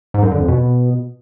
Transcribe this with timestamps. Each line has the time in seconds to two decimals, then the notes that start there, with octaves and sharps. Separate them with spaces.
0.14 G#2
0.23 F#2
0.31 D3
0.40 F2
0.48 B2